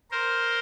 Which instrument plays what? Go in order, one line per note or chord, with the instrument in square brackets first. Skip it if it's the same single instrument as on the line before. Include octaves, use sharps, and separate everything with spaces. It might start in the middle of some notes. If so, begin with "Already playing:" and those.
[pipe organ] A#4 C5